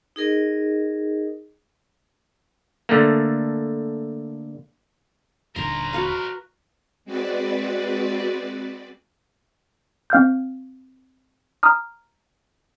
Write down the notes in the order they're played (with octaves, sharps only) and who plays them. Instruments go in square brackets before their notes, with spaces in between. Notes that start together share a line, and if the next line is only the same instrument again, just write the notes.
[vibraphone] D#4 G#4 A#4 D#5
[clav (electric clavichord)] D3 A3 A#3
[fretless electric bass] D#1 D#2 D3 [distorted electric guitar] A#4 C5 [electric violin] A#5 [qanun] C6
[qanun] F#4 B4 F5
[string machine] G#3 C4 F#4 B4 D5
[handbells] C4 F5 F6 G6
A#5 D#6 F6